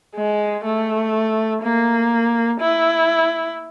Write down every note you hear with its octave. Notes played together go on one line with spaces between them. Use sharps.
G#3
A3
A#3
E4